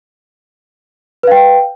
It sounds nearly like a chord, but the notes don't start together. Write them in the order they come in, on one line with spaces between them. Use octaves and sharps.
B4 F5 G5